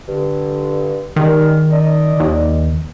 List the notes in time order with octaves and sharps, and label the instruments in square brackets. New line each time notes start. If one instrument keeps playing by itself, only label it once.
[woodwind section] G2 D3
[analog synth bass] D#3 [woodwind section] G3 G#3 A#4
[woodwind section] D5 D#5
[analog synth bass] D#2